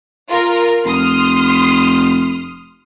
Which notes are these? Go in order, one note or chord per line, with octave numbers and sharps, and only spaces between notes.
F4 A#4
F1 C6 D#6 F6